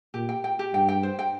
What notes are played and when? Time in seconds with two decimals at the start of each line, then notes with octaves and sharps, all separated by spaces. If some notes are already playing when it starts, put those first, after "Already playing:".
0.14 A#2 G4
0.29 G5
0.44 G5
0.59 G4
0.74 G2 G5
0.88 G5
1.03 C5
1.19 G5